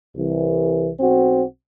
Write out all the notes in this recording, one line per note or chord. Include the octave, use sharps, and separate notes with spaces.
C2 E3
B1 C4 F#4